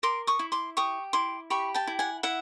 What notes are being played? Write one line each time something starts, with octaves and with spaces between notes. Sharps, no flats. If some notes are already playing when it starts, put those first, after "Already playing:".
A#4 C6 D6
C#6 D#6
E4
C6 D6
G4 C#6 D#6
E4 C6 D6
G4 B5 C#6
G5 A5
E4
F#5 G#5
E4 E5 F#5